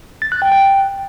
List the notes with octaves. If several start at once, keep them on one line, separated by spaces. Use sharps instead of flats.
A6
F#6
G5
G5